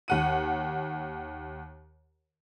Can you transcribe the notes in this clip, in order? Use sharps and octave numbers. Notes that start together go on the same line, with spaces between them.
D#2 F#5 D#7